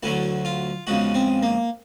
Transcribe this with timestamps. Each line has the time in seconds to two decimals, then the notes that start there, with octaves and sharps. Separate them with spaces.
0.03 D2 D3 F#3 A3 E4
0.45 F4
0.87 E2 C#3 F3 G#3 F#4
1.14 C4
1.43 A#3